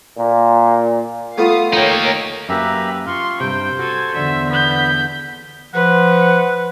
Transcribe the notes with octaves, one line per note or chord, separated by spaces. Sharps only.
A#2
A3 B3 F4 F5 D#6
A#3 D#4 A#4 C#5 G5
F#2 A#3 G4 B4 E5 A#5
F4 F5 C6 C#6
G2 C3 C5 G5
F#4 A4 G#5
E2 D3 E5
B3 G6 B6
F3 B4 F#5